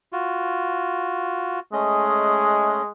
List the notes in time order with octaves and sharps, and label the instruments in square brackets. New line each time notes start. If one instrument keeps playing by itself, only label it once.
[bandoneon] F4 F#4
[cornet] G#3 [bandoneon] A3 C#4 D#5